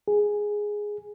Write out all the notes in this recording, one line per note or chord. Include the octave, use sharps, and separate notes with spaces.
G#4